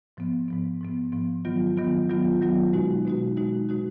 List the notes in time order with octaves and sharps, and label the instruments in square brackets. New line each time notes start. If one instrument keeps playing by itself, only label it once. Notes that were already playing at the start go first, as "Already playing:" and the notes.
[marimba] G#2 F3 B3
G#2 F3 B3
G#2 F3 B3
G#2 F3 B3
D#3 F#3 B3 F4
D#3 F#3 B3 F4
D#3 F#3 B3 F4
D#3 F#3 B3 F4
B2 G#3 D#4 F#4
B2 G#3 D#4 F#4
B2 G#3 D#4 F#4
B2 G#3 D#4 F#4